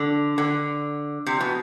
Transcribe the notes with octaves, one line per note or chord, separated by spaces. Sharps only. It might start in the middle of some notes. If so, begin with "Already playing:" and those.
Already playing: D3
D3
C3
B2